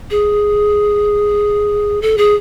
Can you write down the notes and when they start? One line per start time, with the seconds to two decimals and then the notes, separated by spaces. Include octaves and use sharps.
0.11 G#4
2.02 A4
2.18 G#4